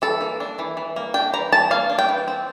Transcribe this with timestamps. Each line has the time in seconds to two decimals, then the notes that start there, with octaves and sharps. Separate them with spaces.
0.02 E3 A4
0.21 A#3
0.40 D4
0.59 E3
0.77 E3
0.96 A#3
1.14 D4 G5
1.33 E3 A#5
1.52 E3 A5
1.71 A#3 F5
1.90 D4
1.99 G5
2.09 E3
2.28 C4